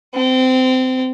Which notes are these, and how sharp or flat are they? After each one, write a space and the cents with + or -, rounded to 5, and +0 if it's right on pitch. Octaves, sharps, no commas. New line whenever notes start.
C4 -25